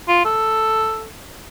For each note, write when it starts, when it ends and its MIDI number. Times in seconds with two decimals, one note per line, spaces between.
0.08 0.21 65
0.25 1.08 69